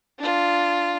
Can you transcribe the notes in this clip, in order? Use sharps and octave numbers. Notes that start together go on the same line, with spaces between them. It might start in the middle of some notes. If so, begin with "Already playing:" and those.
D4 F4